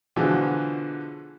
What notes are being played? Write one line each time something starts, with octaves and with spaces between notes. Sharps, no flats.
B2 D3 E3 F3 G#3